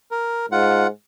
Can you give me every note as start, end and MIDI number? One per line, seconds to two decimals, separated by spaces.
0.11 0.46 70
0.52 0.88 44
0.52 0.87 65
0.52 0.87 78